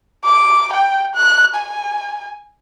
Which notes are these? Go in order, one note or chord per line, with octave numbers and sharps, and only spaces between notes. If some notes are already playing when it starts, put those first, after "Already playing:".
D6
G5
F#6
G#5